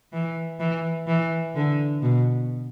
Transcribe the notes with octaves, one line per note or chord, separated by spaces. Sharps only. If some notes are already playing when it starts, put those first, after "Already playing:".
E3
E3
E3
D3
B2